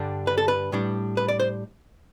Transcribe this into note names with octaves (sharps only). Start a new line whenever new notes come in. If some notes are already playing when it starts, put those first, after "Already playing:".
Already playing: G2 D3 G3 D4
B4
A4
B4
A2 G3 D4
B4
D5
C5